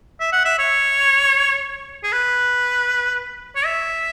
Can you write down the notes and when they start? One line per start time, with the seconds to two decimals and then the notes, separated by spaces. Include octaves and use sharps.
0.20 E5
0.33 F#5
0.45 E5
0.59 C#5
2.04 G#4
2.12 B4
3.56 C#5
3.65 E5